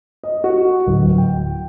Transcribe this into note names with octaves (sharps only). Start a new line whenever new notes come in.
D#5
F#4
D1
G5